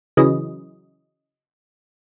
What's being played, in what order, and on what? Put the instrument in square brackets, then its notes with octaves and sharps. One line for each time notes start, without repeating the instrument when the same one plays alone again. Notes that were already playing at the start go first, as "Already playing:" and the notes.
[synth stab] C#3 E3 F#3 D#5